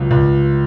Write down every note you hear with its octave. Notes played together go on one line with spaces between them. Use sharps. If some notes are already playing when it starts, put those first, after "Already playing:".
Already playing: C#2 F#3
C#2